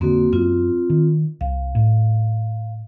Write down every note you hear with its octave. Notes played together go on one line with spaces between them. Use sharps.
F2 D3 A#3 C4 F#4
F#2 C4 F4
D#3
C2 F5
A2